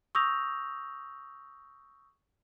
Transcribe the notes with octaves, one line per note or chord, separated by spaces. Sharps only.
C#6 D#6 E6 G6 A#6 F7